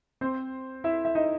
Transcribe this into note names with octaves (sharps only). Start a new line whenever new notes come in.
C4 C5
E4 E5
E5
D#4 D#5